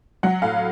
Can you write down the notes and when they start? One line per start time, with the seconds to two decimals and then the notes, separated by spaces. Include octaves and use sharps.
0.23 F#3 F#5
0.42 A2 F5